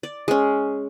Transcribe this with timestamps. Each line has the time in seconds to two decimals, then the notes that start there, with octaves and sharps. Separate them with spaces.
0.03 D5
0.28 G#3 C#4